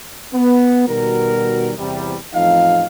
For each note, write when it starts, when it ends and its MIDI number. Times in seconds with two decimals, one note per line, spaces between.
0.33 0.83 59
0.87 1.71 47
0.87 1.71 51
0.87 1.71 55
0.87 1.71 66
0.87 1.71 70
1.78 2.16 40
1.78 2.16 48
1.78 2.16 55
2.34 2.87 33
2.34 2.87 41
2.34 2.87 53
2.34 2.87 63
2.34 2.87 77